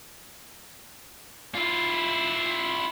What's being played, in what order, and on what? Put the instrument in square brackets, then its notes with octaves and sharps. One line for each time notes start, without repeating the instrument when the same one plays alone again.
[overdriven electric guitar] E4 F4